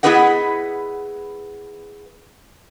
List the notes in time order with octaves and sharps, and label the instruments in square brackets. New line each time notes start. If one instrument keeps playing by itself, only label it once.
[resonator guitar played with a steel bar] B3 E4 G#4 B4 D#5 F#5